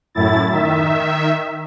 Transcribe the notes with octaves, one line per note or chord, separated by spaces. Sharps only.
F#2 A2 E4 A6
D#3 E5